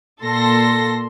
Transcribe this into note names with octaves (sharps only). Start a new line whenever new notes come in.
A#2 A4 C6 A#6